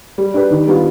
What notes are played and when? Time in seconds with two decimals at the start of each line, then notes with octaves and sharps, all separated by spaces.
0.18 G3
0.34 D4 G4 B4
0.51 D#3
0.67 G3 B3 F4